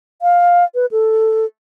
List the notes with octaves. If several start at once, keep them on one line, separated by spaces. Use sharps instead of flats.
F5
B4
A4